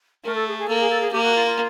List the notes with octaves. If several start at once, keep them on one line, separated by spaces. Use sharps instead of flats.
A3 A#4
A4
G#4
G#4
A#3 A4
G#4
A4
G#4
A#3 G4
F#4
F4
F4